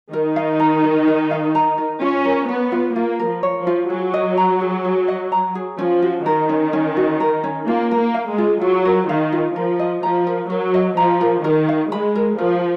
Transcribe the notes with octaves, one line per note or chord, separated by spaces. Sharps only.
D#3 D#4 A#4
F5
A#5
A#4
A#4
F5
A#5
A#4
C#4 F4
A#4
B3 C#5
F4
A#3 F4
A#4
F3
C#5
F3
F4
F#3 G#4
D#5
A#5
G#4
G#4
D#5
A#5
G#4
F3 C#4
F#4
D#3 A#4
C#4
C#4
F#4
A#4
C#4
A#3 F4
A#4
A#3
F5
G#3
F4
F#3 F4
A#4
D#3 F5
F4
F3 A#4
D#5
F3 A#5
A#4
F#3 A#4
D#5
F3 A#5
A#4
D#3 A#4
F5
G#3 B5
A#4
F3 A#4